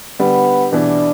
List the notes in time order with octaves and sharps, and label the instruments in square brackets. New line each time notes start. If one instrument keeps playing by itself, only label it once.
[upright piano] D3 G3 [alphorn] B3
[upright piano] B2 E3 [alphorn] D4